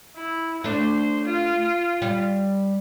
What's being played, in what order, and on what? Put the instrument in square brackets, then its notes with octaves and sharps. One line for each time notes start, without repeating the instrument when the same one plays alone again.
[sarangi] E4
[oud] A3 D4 [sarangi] C5
[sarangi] F4
[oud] G3